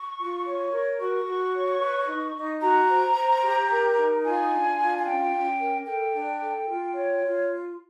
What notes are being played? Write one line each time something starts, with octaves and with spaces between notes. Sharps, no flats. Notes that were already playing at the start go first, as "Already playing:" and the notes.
Already playing: C#6
F4
C#5
A#4
F#4 C#6
F#4
C#5
B4
D#4
D#4
F#4 A#5
C5
C5
G4
A#4
D#4
F4 G#5
D4
F4
G#5
C#4 G5
C#4
A#4
A4 G5
D4
A4
F4
C#5
F4